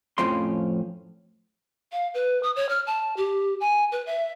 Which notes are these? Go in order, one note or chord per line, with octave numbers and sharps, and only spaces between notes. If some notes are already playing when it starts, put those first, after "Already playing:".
F2 A2 F3 C4 C#4 C6
F5
B4
D#6
C#5
F6
A5
G4
G#5
B4
E5